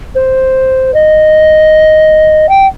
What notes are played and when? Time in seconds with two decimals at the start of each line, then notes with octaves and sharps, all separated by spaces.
0.15 C5
0.94 D#5
2.49 G5